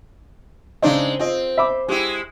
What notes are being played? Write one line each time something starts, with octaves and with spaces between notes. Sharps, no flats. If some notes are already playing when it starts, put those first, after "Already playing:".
C#3 G#3 C4 D4 D#4
C4 F4 D#5
E5 B5 D6
G#3 E4 G4